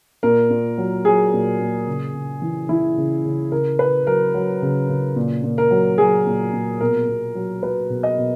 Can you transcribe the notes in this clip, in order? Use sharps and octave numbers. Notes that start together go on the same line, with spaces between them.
A#2 A#4
A#2
F#3
F#3 G#4
A#2
A#2
C#3
C#3
E3
E3 E4
C#3
C#3
C#3 A#4
C#3 B4
F#3 A#4
F#3
C#3
C#3
A#2
A#2
A#4
F#3
F#3 G#4
A#2
A#2
B2 A#4
B2
F#3
F#3 B4
B2
D#5
B2